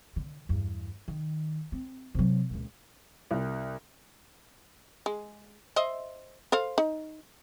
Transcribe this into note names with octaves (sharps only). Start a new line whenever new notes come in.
D3
E2 G2
D#3
C4
C3 F#3
C#2 A#2
C2
G#3
C5 D#5 E5
A4 C5 F5
D#4